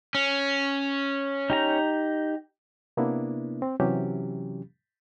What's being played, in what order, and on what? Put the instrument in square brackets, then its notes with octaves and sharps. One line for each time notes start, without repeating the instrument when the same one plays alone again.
[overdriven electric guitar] C#4
[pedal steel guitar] D#4 G4 A#5
[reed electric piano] C3 A#3 B3 D4 E4
C4
C3 E3 F#3 C#4 G4